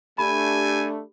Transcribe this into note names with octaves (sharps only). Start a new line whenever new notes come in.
A3 D4 G4 G#5 B5